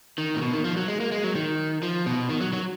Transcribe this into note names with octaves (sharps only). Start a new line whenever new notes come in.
D#3
A#2
B2
D#3
F3
F#3
G#3
A#3
G#3
F#3
D#3
F3
B2
D#3
F#3
F#3